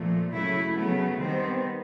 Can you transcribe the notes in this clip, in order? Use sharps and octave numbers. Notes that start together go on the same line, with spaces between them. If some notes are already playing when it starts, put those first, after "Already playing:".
Already playing: A#2 F3 A3
C#3 F#3 A3 E4
C#3 F#3 A3 B3
D#3 G3 B3 C4